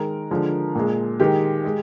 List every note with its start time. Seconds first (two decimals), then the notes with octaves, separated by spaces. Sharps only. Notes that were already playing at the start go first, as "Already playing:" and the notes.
Already playing: D#3 G#3 A#4
0.31 D3 F3 G#3
0.75 A#2 G#3
1.20 D#3 G#3 G4
1.65 G#3